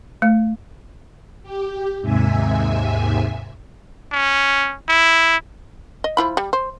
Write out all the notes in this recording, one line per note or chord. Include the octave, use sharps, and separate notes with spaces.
A3
G4
D#2 G#2 C3 E5 G#5
C#4
E4
D#5
F3 E4 B5
G3
C5